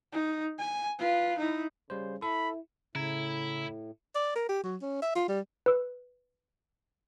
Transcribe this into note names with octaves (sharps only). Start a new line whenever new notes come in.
D#4
G#5
F4 B4
D#4 E4
C#3 G3 C5
E4 A4 B5
A2 C#3 E4 A#5 G#6
D5
A#4
G4
F#3
C#4
E5
F4
G3
B4 E6